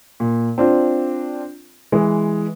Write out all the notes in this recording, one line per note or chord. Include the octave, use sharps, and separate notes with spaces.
A#2
C4 D4 F4
E3 G#3